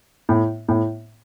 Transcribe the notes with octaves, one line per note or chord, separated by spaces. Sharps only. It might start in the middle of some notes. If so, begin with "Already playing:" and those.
A2
A2